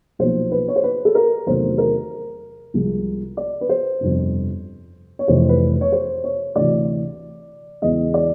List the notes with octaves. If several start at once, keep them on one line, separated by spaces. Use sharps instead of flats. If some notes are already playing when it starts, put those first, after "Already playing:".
B1 A#2 F3 C5
B4
C#5
C5
B4
A4
A#4
E2 C3 D#3 F#3 A3 C5
A#4
C2 C3 F3 G#3
D5
B4
C5
G1 F2 C3
C#5
F1 F2 C3 E3 C5
B4
C#5
C5
C#5
D2 C3 E3 D5
E2 C#3 E3 G#3 D#5
D5